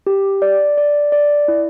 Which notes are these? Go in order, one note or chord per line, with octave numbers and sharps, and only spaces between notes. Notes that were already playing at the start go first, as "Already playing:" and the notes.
G4
D5
D5
D5
E4